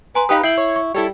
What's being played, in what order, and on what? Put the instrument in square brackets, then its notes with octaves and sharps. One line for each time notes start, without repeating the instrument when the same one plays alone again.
[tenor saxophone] B4 [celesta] G#5 A#5 C6
[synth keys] D#4 B4 [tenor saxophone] G4 [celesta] F5 G5 D#6
[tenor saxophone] E4 [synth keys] G5 [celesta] C7 F#7
[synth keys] C#5
[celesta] C#6
[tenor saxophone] G3 [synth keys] E4 A4 C#5